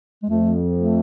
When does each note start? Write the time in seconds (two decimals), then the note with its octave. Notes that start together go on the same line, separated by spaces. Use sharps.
0.23 G#3
0.29 F2 A3
0.77 A3